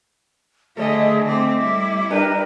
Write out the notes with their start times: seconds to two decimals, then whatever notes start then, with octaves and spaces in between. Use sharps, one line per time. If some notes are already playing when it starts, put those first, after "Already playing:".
0.77 D3 A3 G#4 A4 C#5 D#5
1.28 A3 C4 D6
1.61 G3 E4
2.10 D4 G4 A#4 B4